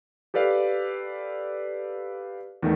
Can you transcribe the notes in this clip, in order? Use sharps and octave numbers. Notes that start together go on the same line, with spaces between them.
G4 A4 B4 D5 F5
E2 D#3 A3